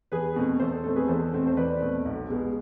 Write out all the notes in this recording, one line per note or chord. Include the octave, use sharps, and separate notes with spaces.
E2 G#4 B4
B2 A3 C4
E2 A4 C5
A4
B2 A3 C4 A4
G#4 B4
E2 A4 C5
B2 A3 C4
C5
E2 B4 D5
B2 A3 C4
B1
B2 G#3 B3